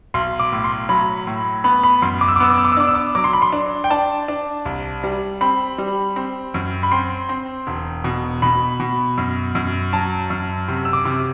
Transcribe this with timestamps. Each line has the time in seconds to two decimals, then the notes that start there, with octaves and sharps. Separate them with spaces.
0.14 B1 C6
0.40 D6
0.52 A2
0.64 C6
0.89 F#3 B5
1.27 A2
1.64 B3 B5
1.83 B5
2.02 F#2 C6
2.21 D6
2.28 E6
2.36 D6
2.40 B3 E6
2.50 D6
2.58 E6
2.65 D6
2.72 E6
2.77 D4 D6
2.87 E6
2.95 D6
3.15 F#3 D6
3.24 C6
3.33 B5
3.42 C6
3.52 D4
3.84 G5
3.90 D4 A5
4.28 D4
4.65 C2
5.04 G3
5.41 C4 B5
5.78 G3
6.16 C4
6.54 F#2
6.83 B5
6.92 C4 C6
7.29 C4
7.67 E1
8.04 B2
8.42 B2 B5
8.80 B2
9.18 F#2
9.55 F#2
9.93 F#3 A5
10.30 F#2
10.68 C3
10.85 E6
10.93 D6
11.05 C3